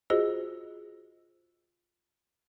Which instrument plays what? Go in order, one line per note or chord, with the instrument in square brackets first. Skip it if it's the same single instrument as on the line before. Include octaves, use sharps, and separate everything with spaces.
[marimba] F4 F#4 G#4 C5 D#5